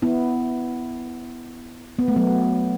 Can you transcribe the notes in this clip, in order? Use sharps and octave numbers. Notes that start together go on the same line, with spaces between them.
B3 E4
B3
A3
F#3 B3